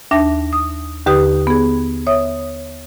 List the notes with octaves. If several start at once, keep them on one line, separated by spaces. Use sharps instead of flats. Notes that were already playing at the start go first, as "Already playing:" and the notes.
D#2 D4 E5 A5 A#6
D#6
D#2 D3 G4 B4 D#6
B3 G#4
C#5 E5 D#6